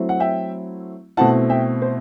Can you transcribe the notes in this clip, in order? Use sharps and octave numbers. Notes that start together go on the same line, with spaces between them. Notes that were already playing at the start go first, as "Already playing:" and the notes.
Already playing: F#3 A3 C4 E4
F#5
E5 G5
B2 A3 C4 E4 F#5 A5
E5 G5
C5